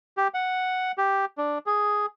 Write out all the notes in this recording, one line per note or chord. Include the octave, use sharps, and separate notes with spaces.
G4
F#5
G4
D4
G#4